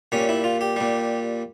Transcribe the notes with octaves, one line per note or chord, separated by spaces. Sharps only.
A#2 G3 C#4
E4
F4
G4
A#2 G3